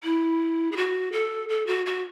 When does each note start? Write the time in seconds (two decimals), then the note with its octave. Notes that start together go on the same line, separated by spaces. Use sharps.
0.04 E4
0.72 G#4
0.77 F#4
1.12 A4
1.49 A4
1.67 F#4
1.86 F#4